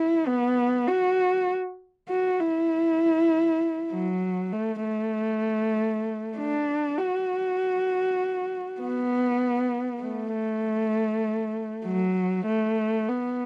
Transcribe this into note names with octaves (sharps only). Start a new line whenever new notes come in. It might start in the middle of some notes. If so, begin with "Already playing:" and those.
Already playing: E4
B3
F#4
F#4
E4
F#3
A3
A3
D4
F#4
B3
A3
F#3
A3
B3